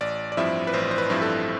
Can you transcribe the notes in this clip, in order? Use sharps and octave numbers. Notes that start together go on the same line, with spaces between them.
A1 D5
D5
G2 F3 C4 E4 E5
B4
A1 C5
C5
B4
G2 F3 C4 E4
A4